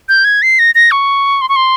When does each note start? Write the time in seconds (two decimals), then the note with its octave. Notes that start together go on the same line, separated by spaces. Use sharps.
0.09 G6
0.25 G#6
0.42 C7
0.59 A#6
0.75 A#6
0.91 C#6
1.41 C6
1.49 C#6
1.56 C6